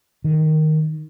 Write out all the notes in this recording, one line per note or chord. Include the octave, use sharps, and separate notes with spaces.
D#3